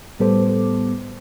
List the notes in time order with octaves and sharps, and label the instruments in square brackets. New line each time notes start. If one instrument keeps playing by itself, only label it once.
[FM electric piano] A2 G3 B3 A4 C5 D6